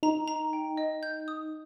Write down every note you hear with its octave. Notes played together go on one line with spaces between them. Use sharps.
D#4 A#5
A#5
G5
D#5
G6
D#6